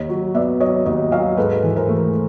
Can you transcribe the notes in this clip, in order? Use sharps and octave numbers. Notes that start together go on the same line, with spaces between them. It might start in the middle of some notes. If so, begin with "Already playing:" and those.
Already playing: D#2 C#5 D#5
F#3
B3 D5 E5
F#3 C#5 D#5
D#2 C#5 D#5
F#3 D#5 F5
G#2 A4 B4
E3
A#4 C5
A3